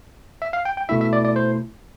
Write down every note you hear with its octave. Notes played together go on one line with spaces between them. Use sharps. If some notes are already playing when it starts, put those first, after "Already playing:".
E5
F5
G5
G5
B2 A3 E4 E5
E5
D5
D5
C5